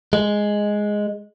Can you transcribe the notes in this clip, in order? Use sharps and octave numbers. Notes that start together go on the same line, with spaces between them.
G#3